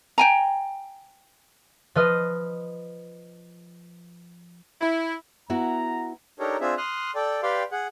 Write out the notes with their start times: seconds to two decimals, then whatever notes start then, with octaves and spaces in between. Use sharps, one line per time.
0.18 G5 G#5 A#5
1.95 F3 B4 D#5 F6
4.81 E4
5.50 B3 E4 F#4 A#5
6.39 D4 D#4 G4 A4 A#4 C#5
6.60 C4 D4 F4 G#4 E5
6.78 C6 D#6 F6 F#6
7.15 A4 D5 G5
7.43 G4 B4 D5 F5 G5 C6
7.72 G#4 F#5